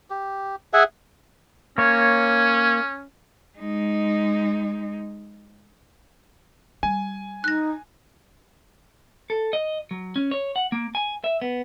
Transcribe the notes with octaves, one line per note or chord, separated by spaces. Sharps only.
G4
G#4 E5 F#5 G#5
A#3 C#4 C#5
G#3 D#4
G3 G#5
D#4 F#6 A#6
A4
D#5
F#3
C#4
C#5
F#5
A#3
G#5
E5
B3